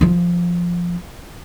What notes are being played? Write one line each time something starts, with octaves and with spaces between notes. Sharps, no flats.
F3 F4